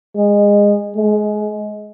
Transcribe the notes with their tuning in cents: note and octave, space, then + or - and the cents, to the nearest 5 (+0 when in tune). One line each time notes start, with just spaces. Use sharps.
G#3 -20
G#3 +25